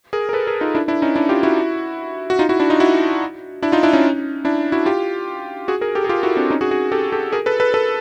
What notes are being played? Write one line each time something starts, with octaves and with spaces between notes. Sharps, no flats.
G#4 A#4
A#4
A4 B4
G#4 A#4
D#4 F4
D4 E4
D4 E4
C#4 D#4
D4 E4
F4 G4
E4 F#4
F#4
D#4 F4
E4 F#4
D4 E4
D#4 F4
E4 F#4
D4 E4
D#4 F4
D4 E4
C#4 D#4
D4 E4
E4 F#4
F4 G4
F#4 G#4
G#4 A#4
G4 A4
G#4
F4 G4
E4 F#4
C4 D4
C#4 D#4
F#4 G#4
F#4 G#4
G4 A4
G4 A4
G#4 A#4
A4 B4
A4 B4
A4 B4